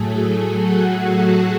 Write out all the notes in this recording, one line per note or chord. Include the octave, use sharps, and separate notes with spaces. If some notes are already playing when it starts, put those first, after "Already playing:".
Already playing: A2 F#3 A3 G#4 A4
G#4
F#4 F#5